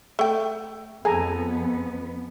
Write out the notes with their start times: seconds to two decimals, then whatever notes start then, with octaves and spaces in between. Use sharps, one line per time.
0.19 A3 G5
1.05 F2 B3 G#4 A4 G#5 A#5